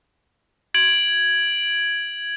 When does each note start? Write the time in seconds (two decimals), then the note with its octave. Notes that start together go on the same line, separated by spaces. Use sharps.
0.74 G#6 D7 F#7